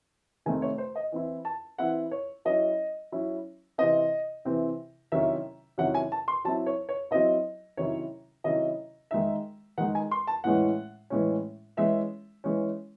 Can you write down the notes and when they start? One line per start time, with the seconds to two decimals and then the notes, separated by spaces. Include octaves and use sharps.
0.46 C3 D#3 A3 C4 G#5
0.62 C#5
0.78 C5
0.96 D#5
1.12 E3 C4 E4
1.45 A5
1.78 E3 C4 E4 F#5
2.11 C#5
2.45 F#3 C#4 E4 D#5
3.12 F#3 C#4 E4
3.78 C3 E3 C4 D#5
4.45 C3 E3 C4
5.12 C3 D#3 F#3 C#4 E4 E5
5.78 C3 D#3 F#3 C#4 E4 F#5
5.94 G#5
6.12 A5
6.28 C6
6.45 F#3 C4 E4 A5
6.66 C#5
6.89 C#5
7.11 F#3 C4 E4 D#5
7.77 C3 D#3 F#3 C#4 E4 C#5
8.44 C3 D#3 F#3 C#4 E4 D#5
9.11 D#3 G#3 D#4 E5
9.78 D#3 G#3 D#4 F#5
9.95 G#5
10.11 C6
10.27 A5
10.44 A2 E3 G#3 C#4 F#5
11.10 A2 E3 G#3 C#4
11.77 E3 G#3 C#4 E5
12.44 E3 G#3 C#4